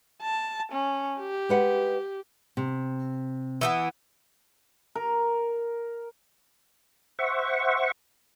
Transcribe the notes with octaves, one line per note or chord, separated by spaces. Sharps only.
A5
C#4
G4
G#3 B4 F#5
C3
E3 A3 B3
A#4
C5 E5 F#5 C#6